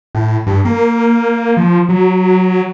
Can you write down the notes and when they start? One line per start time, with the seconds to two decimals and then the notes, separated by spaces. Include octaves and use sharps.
0.15 A2
0.47 G2
0.65 A#3
1.57 F3
1.89 F#3